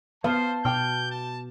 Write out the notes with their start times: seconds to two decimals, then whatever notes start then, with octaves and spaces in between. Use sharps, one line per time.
0.24 B3 C5 F5 A5
0.65 B2 G5 D6 F6 G6
1.11 A5